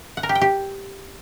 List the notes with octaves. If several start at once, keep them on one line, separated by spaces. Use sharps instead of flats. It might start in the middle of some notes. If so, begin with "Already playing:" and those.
F#5
A#4
G4
G5
G4